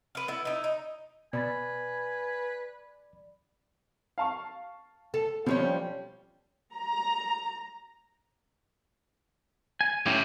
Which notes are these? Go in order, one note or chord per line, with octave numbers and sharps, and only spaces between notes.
B4 F5
B3 E4
D#4 E4
D#4
B2 B4 D5 G#5 B5 A6
F5 A5 C#6
A4
B2 F3 G3 C#5
C#4
A#5
G#5
A2 C#4 E4 G4